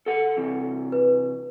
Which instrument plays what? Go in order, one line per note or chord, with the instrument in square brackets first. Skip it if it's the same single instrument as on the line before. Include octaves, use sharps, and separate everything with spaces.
[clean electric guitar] A4 F#5
C3 E3
[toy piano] B4